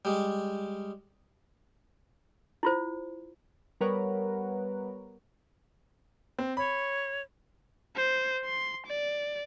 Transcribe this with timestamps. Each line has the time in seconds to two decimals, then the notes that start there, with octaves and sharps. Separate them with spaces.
0.05 G3 G#3
2.63 E4 F4 C5
3.81 G3 B3 A#4 B4 C#5 F#5
6.39 C4
6.57 C#5 B5
7.96 C5
8.45 C6
8.86 D5